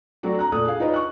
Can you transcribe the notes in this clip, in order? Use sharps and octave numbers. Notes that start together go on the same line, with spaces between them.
F#3 A3 C4 D4 F#4
A#5 F#6
A#2 A3 D4 A4 D#6 F#6
G#4 F5
D4 D#4 F4 B4 C#5 D#5
C#6 F#6